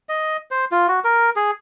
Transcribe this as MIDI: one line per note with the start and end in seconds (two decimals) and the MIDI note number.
0.09 0.37 75
0.51 0.65 72
0.72 0.87 65
0.88 1.00 66
1.04 1.30 70
1.36 1.51 68